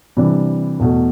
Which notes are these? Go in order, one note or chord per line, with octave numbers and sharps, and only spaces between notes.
C3 E3 G3 D4
E2 B2 A3